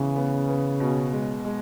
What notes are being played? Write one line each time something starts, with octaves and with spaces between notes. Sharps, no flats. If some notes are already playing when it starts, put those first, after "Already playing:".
Already playing: C#3 E3 B3
B3
B3
B2
G#3
G#3